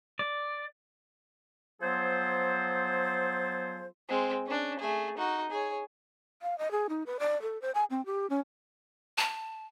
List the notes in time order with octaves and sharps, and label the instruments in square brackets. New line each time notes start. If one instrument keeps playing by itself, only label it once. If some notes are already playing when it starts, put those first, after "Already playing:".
[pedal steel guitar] D5
[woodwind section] F3 F#3 B3 G#4 A4 C5
[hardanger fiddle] G#3 C4
C#4 D4
A3 G#4
D#4 F#4
G#4 C#5
[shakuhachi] F5
D#5
G#4
D#4
B4
D5
A4
C5
G#5
C4
G4
C#4
[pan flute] A5